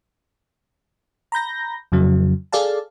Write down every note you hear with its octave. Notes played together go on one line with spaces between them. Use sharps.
A#5 B5 G6 A#6
F2 C#3 F#3
G#4 A4 D5 F5 A5